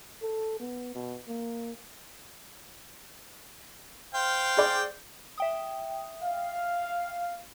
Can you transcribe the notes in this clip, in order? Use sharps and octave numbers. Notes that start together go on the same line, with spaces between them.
A4
B3
B2
A#3
C5 F5 G5
G#4 D5
E5 G5 D#6
F5